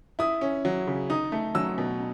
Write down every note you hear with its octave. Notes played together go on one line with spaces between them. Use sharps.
E4 D#6
C#4
F#3
C#3
D#4 D#6
A3
F#3 E6
B2